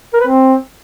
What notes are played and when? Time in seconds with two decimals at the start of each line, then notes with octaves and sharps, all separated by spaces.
0.13 A#4
0.20 B4
0.27 C4